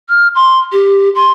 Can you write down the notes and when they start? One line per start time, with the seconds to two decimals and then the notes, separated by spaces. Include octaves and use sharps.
0.09 F6
0.35 C6
0.72 G4
1.15 C6